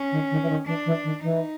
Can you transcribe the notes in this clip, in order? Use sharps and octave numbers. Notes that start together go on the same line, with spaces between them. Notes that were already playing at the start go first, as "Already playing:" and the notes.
Already playing: C#4
D#3
D#3
E3
D#3
E3 D4
E3
D#3
E3 D#4